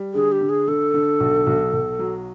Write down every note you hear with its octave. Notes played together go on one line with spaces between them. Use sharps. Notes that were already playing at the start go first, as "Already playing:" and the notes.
Already playing: G3
D3 G#4
G4
D3
G#4
D3 A4
D3
B1
B1
B1
F#3